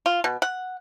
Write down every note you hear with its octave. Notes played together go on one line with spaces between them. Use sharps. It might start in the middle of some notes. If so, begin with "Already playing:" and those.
F4
B2
F#5